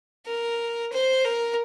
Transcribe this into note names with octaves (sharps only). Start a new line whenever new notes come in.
A#4
C5
A#4